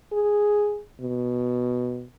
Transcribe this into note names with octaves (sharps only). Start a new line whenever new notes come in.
G#4
B2